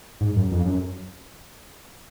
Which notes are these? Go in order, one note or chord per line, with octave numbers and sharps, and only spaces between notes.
G#2
F#2
F2
F#2